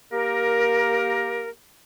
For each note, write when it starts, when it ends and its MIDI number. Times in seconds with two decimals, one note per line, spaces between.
0.12 1.49 58
0.12 1.49 67
0.12 1.49 70